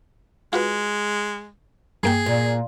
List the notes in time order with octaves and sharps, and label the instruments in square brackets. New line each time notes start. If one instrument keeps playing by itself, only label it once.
[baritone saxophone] G#3 [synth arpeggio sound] F4 F#4 B4
[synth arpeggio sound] G2 A#3 G5 [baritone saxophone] G#4
[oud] A#2